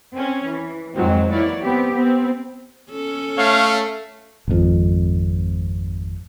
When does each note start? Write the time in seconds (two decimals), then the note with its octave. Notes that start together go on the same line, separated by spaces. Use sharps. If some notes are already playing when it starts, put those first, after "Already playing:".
0.15 C4 C#4
0.45 E3
0.94 F2 G#2 D#3 F#3 G#3 C4
1.32 E3 F#3 A#3 E4 C#5 D5
1.61 B3 C4 G4
1.91 B3 C4
2.91 C#4 A4
3.38 A3 C#5 F5
4.48 G#1 F2